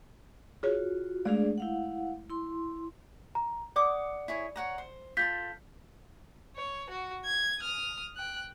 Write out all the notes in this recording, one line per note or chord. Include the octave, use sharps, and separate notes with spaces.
F4 F#4 G#4 C#5
G#3 A3 D4 G#4 D5
E4 F5 F#5
E4 C6
A#5
D5 F#5 D6 D#6
E4 G#4 C#5
C#5 F#5 A#5
C5
F4 A4 C6 G6 B6
C#5
F#4
G#6
D#6 F6
G5 F#6